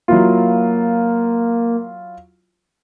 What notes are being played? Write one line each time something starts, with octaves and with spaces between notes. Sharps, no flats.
F#3 A#3 E4 F4